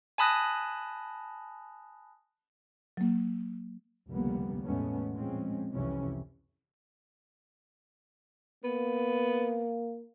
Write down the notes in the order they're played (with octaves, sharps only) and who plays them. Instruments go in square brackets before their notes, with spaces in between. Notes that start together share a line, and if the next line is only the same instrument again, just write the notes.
[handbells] G#5 A5 B5 D#6 F#6 A#6
[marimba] F#3 A#3
[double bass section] F1 C#2 D3 G3 A#3 B3
E2 A2 G#3 A3 B3 C#4
A#2 F3 G#3 C4 C#4
C2 F2 C3 E3 C#4
[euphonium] A#3 [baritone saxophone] B3